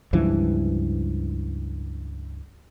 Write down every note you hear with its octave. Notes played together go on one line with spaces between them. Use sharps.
C#2 G2 E3 F3